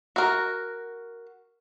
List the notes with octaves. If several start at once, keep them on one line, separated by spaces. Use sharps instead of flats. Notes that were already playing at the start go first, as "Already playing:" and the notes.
F#4 A#4